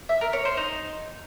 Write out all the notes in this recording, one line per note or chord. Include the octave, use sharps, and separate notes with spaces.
E5
A#4
C#5
C5
D#4